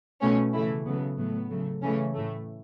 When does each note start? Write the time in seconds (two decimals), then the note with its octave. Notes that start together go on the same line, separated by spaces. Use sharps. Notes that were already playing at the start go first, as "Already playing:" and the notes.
0.21 B2 A3 C#4
0.53 C#3 E3 A3 E4
0.85 C#3 F#3 A3 B3
1.18 A2 F#3 A3 B3
1.50 C#3 F#3 A3
1.82 C#3 E3 A3 C#4
2.15 A2 A3